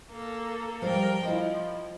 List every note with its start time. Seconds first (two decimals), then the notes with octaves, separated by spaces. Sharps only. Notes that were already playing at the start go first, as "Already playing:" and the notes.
0.11 A#3 A4
0.82 F3 G3 A#4 F5 G5
1.24 F3 E4 D#5 F5